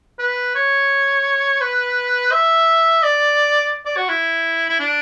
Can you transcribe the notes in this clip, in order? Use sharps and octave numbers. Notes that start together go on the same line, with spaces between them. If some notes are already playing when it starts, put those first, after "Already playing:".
B4
C#5
B4
E5
D5
D5
F#4
E4
E4
D4